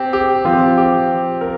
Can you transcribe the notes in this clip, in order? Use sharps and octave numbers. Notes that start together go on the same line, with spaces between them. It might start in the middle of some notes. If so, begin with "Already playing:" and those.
Already playing: C4 G4
G4
F3 C4 F4
G4
A#4